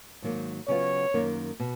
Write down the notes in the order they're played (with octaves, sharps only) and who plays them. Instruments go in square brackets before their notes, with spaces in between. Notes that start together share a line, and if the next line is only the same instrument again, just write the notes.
[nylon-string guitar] G#2 D#3 F#3 A#3
[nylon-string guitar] C#3 F#3 B3 F4 [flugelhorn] C#5
[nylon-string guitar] F#2 D#3 A#3
B2